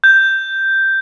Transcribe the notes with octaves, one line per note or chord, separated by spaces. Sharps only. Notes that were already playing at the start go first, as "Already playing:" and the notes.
G6